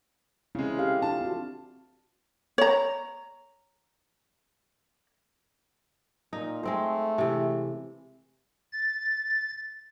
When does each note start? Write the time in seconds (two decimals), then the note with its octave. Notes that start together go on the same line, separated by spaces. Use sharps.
0.55 C#3 G#3 C4 E4
0.77 G4 A4 F5
1.02 D4 F4 A5
1.21 C4 F#4
2.58 C#5 A#5
6.33 A#2 D#4
6.63 G#3 A3 C4 C5
7.18 C3 E3
8.73 A6